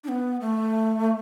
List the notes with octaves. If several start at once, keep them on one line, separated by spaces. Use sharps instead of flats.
D4
B3
A3